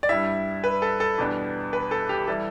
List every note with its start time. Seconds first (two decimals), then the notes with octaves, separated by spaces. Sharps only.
0.03 D5
0.09 G2 G3 E4 E5
0.64 B4
0.82 A4
1.00 A4
1.18 E2 B2 G3 B3 D4
1.73 B4
1.91 A4
2.09 G4
2.27 E3 G3 E4 A4